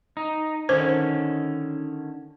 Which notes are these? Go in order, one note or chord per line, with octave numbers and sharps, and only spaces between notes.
D#4
D3 D#3 C#4 C5